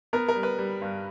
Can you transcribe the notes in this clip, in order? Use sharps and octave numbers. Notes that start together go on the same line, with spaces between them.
B3 A#4
A#4
G3
B4
G3
G2